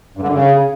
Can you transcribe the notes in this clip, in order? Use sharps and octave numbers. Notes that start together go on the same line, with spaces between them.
G2
D3
F#2
C#3